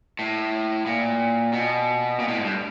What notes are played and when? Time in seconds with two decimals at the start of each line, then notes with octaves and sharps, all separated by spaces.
0.19 A2
0.86 A#2
1.53 B2
2.19 A#2
2.28 A2
2.36 G#2
2.44 G2